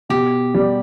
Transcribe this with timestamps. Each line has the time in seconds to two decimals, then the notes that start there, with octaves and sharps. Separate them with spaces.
0.09 B2 G4
0.55 G3